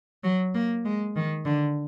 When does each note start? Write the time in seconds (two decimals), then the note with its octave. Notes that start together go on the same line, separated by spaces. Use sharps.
0.24 F#3
0.54 A#3
0.85 G#3
1.16 D#3
1.46 D3